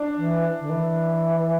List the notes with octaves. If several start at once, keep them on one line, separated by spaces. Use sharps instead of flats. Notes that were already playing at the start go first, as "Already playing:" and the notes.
Already playing: D4
E3
D3
E3